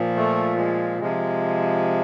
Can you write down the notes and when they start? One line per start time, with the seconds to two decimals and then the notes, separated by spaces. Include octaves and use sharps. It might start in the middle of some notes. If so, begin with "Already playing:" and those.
Already playing: A#2 F3
0.16 A3
0.57 G#3
1.00 C3 F3 G#3